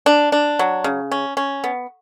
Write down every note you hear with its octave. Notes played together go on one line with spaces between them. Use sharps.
D4
D4
F#3
C#3
C#4
C#4
B3